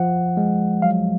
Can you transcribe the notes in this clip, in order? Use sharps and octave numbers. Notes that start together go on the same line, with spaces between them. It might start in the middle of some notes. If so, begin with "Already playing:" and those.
Already playing: F3 F#5
G#3
F#3 F5